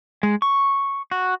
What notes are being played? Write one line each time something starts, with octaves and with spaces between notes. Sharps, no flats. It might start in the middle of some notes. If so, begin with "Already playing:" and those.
G#3
C#6
F#4